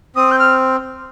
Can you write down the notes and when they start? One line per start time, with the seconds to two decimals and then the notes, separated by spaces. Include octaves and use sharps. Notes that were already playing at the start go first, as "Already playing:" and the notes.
0.15 C4 D#6
0.31 G6
0.39 F6